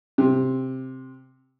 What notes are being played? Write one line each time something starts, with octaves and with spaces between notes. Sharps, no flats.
C3